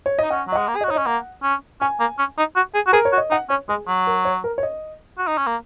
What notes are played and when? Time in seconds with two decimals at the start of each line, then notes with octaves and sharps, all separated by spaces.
0.06 C#5
0.19 D#4 D#5
0.30 C#4 F#5
0.48 F#3 D#5
0.55 G#3 F#5
0.68 A#3
0.76 G#4
0.81 D#5
0.84 F#4
0.88 C#5
0.91 D#4
0.96 D#5
0.98 C#4
1.06 A#3 F#5
1.43 C#4
1.81 C#4 G#5
2.00 A#3
2.19 C#4
2.38 D#4
2.56 F#4
2.75 G#4
2.87 F#4
2.93 G#4 A#4
3.05 C#5
3.13 F#4
3.18 D#5
3.31 D#4 F#5
3.50 C#4 C#5
3.69 G#3 G#4
3.87 F#3
4.07 A#4
4.25 C#5
4.44 A#4
4.58 C#5
4.63 D#5
5.18 F#4
5.28 D#4
5.38 C#4
5.47 A#3